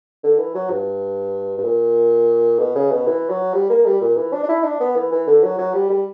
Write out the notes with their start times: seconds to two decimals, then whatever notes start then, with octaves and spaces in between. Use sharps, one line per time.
0.23 D3
0.39 E3
0.55 F#3
0.70 G2
1.58 G2
1.65 A#2
2.59 B2
2.75 C#3
2.92 B2
3.07 E3
3.30 F#3
3.54 G3
3.70 A#3
3.86 G3
4.01 A#2
4.17 E3
4.33 D4
4.43 D4
4.49 E4
4.64 D4
4.80 B3
4.96 E3
5.12 E3
5.27 D3
5.44 F#3
5.58 F#3
5.74 G3
5.90 G3